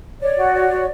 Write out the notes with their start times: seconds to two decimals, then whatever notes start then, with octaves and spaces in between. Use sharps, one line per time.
0.20 C#5 D5
0.37 F#4
0.53 C#5
0.71 F#4